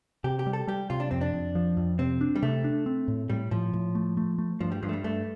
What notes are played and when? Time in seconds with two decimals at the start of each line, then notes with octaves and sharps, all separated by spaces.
0.24 C3 G4
0.39 G4
0.46 G3
0.53 A4
0.68 G3 G4
0.90 C3 F4
1.00 D4
1.11 F2 C4
1.21 D4
1.34 F2
1.55 F3
1.77 F2
1.99 C3 C4
2.21 D4
2.36 G3
2.43 C3 A3
2.64 D4
2.86 C4
3.08 A2
3.30 A2 G3
3.51 A2 F3
3.73 A2
3.95 A3
4.17 A3
4.38 A3
4.60 G2 F3
4.72 G3
4.83 G2 F3
4.89 A3
4.93 G3
5.04 G2 A3